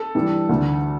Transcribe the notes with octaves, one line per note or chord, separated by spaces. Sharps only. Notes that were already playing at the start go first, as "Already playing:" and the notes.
Already playing: A4
G2 E3 G3
D2 D3 A3